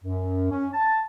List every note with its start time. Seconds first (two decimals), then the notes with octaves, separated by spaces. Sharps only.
0.03 F#2
0.51 C#4
0.72 A5